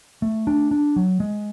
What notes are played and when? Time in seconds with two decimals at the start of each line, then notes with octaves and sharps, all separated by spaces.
0.22 A3
0.47 D4
0.71 D4
0.96 F#3
1.20 G#3